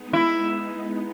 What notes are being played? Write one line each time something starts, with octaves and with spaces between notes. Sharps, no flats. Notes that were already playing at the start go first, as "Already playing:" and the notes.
Already playing: G#3 B3 D#4
E4